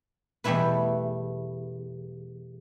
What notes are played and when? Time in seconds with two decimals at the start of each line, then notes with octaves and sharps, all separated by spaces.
0.44 E2 B2 G3 A3 E4 B4